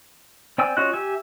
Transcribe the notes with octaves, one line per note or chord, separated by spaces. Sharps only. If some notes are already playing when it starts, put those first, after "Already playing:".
C4 D5 G5 G#5 E6
C#4 F4 F#4 D#5 F#6
G4 E5 G#5